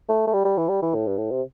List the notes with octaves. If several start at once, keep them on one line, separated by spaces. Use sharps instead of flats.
A3
A3
G3
G3
E3
G3
E3
A2
G2
A2
C3